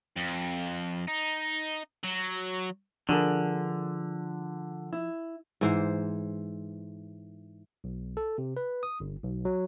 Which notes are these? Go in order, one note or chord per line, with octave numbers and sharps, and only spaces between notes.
F2
D#4
F#3
D3 F3 D4 G#4 A#4
E4
G#2 E3 C5
B1
A4
C3
B4
D#6
G1
B1
F#3